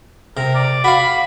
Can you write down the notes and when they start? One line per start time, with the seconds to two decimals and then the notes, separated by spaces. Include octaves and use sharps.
0.37 C3 A#4
0.55 D5
0.84 F#4 F5 B5